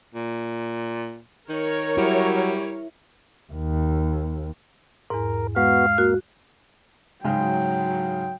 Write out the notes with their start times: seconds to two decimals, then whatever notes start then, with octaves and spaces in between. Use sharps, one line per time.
0.15 A#2
1.49 D#3 A#4 C#5
1.97 F#3 G3 E4
3.53 D#2
5.10 E2 G#2 A#4
5.56 G#3 B3 F#4 F5
5.98 A#3 F#4
7.24 G#2 C#3 F#3 G#3 G5